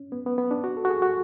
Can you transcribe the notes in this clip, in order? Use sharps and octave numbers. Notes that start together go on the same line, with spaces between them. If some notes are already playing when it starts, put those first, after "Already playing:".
Already playing: C#4
B3
B3
B3
D4
F#4
A4
F#4
G#4
F#4